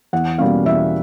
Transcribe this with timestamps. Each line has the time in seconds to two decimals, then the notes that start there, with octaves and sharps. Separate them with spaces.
0.13 E2 F#5
0.38 B2 G3 A#3 C#4 F5
0.65 E2 E5